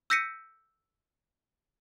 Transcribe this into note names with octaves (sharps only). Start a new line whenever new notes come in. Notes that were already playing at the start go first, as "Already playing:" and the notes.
E6 G6 A#6 B6 C#7 D#7